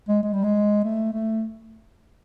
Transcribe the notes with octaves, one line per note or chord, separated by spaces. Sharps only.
G#3
G#3
G3
G#3
A3
A3